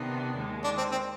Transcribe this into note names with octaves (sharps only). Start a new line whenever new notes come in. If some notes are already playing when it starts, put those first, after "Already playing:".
Already playing: C3 D#3 B3 D4
D#2 D#3 G#3
D4
C4
C4